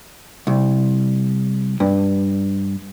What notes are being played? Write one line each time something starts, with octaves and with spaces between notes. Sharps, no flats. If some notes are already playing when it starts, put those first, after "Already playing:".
C2
G2